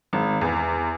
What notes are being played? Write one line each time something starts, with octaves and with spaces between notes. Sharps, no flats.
G#1
E2